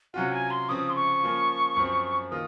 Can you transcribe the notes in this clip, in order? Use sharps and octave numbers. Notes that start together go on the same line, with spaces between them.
C3 F#3 C#4 F4 F#5
G#5
C6
C#3 F3 C4 D#6
C6
C#6
F3 A#3 C#4 F4
F#2 F3 C4
D#3 A#3 F4 D#6